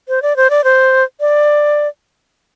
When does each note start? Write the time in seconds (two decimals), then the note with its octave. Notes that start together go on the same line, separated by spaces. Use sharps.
0.09 C5
0.22 D5
0.37 C5
0.50 D5
0.64 C5
1.20 D5